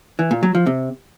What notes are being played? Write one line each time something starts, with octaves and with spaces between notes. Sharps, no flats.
E3
A#2
F#3
F3
C3